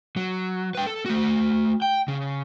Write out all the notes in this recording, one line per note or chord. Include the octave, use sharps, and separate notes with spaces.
F#3
B4 G5
A4
A3 F#4
G5
C#3